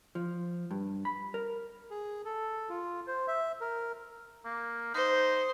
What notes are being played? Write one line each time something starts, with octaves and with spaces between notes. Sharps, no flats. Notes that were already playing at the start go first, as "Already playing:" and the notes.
F3
G2
B5
A#4
G#4
A4
F4
C5
E5
A#4
A#3
D#4 C5